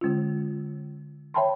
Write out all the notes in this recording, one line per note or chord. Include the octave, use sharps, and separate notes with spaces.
D3 G#3 C#4 F4
C#5 E5 G5 A5 B5 C6